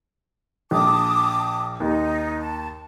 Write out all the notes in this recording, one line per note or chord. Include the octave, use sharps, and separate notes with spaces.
A#1 A5 D6 D#6
D#2 D#4
A5